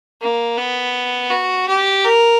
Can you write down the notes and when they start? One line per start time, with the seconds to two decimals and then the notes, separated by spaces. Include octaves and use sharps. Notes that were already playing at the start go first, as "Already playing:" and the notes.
0.21 A#3
0.57 B3
1.31 F#4
1.68 G4
2.05 A#4